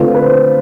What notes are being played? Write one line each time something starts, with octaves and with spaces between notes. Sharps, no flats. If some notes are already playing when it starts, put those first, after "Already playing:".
Already playing: D3 A3 C4 F4 B4
B4
C5